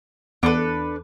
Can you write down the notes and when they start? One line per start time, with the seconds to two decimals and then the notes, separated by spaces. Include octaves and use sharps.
0.43 E2 D4 A4 B4